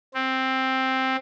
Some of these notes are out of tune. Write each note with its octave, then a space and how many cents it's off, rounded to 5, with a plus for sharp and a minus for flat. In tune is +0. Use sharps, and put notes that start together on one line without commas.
C4 +5